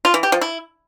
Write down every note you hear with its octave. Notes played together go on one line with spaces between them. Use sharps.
F4
E3
G4
F3
E4